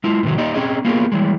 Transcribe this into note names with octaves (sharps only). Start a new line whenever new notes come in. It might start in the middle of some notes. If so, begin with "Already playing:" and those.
G#3 E4 F4
A2 C3 D#3 F#3
A#3 D#4 G4 D5 D#5
C4 C#4 G#4 D#5
A#3 B3 F4 G4 G#4 A#4
E3 G3 G#3